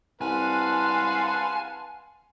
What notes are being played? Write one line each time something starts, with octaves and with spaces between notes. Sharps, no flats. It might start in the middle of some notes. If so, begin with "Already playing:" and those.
C2 B4 F5 F#5 G#5 A5 C6